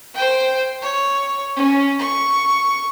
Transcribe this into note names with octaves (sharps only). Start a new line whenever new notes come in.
C5 G5
C#5
C#4
C#6